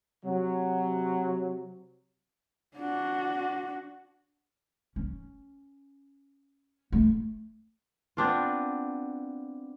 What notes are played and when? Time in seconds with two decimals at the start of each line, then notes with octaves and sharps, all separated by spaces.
0.24 C3 F#3
2.76 D4 F#4
4.96 C#4
6.92 A3
8.17 B3 C4 D4 F4